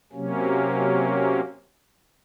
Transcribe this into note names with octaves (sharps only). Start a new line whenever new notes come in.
C3 F#3 A#3 C#4